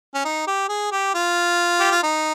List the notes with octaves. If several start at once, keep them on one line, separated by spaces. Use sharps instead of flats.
C#4
D#4
G4
G#4
G4
F4
G4
F4
D#4